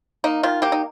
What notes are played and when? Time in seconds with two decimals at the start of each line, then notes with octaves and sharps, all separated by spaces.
0.24 A#3 D#4
0.43 D#3 F4
0.62 A#3 G4
0.72 D#4